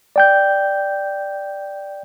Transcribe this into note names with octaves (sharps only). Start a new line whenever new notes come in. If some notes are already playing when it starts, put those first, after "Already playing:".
D5 G5 G6